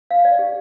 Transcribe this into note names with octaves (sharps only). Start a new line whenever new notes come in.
F5
D5
G4